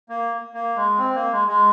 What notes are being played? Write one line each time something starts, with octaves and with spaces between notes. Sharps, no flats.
A#3
A#3
G#3
C4
A#3
G#3
G#3